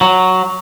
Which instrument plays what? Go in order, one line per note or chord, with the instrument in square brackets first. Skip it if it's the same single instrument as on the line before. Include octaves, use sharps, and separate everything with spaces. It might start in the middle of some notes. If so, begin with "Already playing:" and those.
[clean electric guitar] F#3